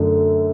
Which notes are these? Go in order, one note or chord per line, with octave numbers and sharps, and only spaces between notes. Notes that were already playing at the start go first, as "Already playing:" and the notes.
Already playing: F#2 D3 A3